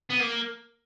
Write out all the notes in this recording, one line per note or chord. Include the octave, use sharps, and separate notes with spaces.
B3
A#3